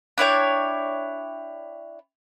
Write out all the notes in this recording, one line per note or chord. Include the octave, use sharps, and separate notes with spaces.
D4 E4 C#5 G5